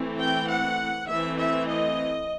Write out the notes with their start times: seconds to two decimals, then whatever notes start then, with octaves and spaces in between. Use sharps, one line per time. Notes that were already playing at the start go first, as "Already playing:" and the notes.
Already playing: E3 A3 C4
0.20 G5
0.50 F#5
1.09 E3 A3 C4 E5
1.38 E5
1.68 D#5